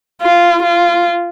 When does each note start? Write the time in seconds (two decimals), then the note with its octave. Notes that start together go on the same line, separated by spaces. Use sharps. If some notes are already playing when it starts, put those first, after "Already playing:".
0.22 F4
0.63 F4